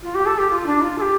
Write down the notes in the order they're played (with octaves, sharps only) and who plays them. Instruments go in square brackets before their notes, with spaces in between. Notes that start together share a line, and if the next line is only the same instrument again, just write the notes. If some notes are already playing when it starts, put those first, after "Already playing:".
[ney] F4
G4
A4
G4
F4
D4
F4
A4
G4